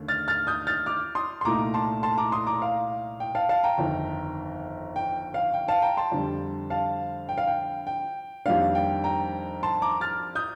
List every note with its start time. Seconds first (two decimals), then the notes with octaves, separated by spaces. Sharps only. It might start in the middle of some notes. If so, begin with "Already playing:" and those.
Already playing: D#2 D3 A3
0.08 F6 A6
0.28 F6 A6
0.47 D#6 G6
0.67 F6 A6
0.86 D6 F6
1.15 C6 D#6
1.41 C6
1.45 C2 A#2 A3 D#4 A#5 D6
1.74 A5 C6
2.03 A5 C6
2.18 A#5 D6
2.32 C6 D#6
2.47 A#5 D6
2.62 F5
3.20 G5
3.35 F5 A5
3.49 F5 A5
3.63 G5 A#5
3.78 G1 F2 D#3
4.96 G5
5.34 F5
5.54 G5
5.68 F5 A5
5.82 G5 A#5
5.97 A5 C6
6.12 F2 D3 G3
6.70 F5 A5
7.29 G5
7.38 F5
7.47 G5
7.87 G5
8.45 F2 D#3 G3 A#3 D4 F5
8.75 G5
9.04 G5 A#5
9.63 A5 C6
9.82 A#5 D6
10.01 F6 A6
10.35 D#6 G6